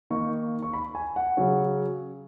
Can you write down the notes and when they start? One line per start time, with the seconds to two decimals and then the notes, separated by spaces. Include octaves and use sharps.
0.10 D#3 A#3 D#4 C#6
0.62 C#6
0.73 B5
0.95 G#5
1.16 F#5
1.37 C#3 F#3 C#4